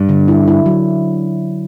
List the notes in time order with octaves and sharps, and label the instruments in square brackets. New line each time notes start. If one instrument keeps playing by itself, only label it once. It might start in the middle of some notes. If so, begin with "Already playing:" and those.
Already playing: [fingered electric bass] G2
[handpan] D3
E4
E4
F#3